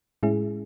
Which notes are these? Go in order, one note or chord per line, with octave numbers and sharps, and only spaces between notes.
A2 G#3 C#4 E4 G#4